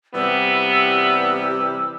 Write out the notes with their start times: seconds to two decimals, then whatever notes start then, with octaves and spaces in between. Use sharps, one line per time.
0.14 C3 E3 G3 B3 E6